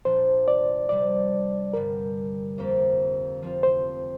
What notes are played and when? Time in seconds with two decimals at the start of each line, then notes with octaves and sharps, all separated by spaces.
0.05 A#2 F3 D4 C5
0.48 D5
0.89 C3 G3 D4 D5
1.73 G2 D3 G3 A#4
2.58 F2 F3 A#3 G4
3.42 F3 C4 F4
3.63 C5